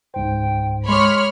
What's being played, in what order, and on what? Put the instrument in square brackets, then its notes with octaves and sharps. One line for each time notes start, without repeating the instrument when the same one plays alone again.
[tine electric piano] C#2 G#2 C5 [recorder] G5
[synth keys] G#3 D6 [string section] C#5 B5 F6 [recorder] C6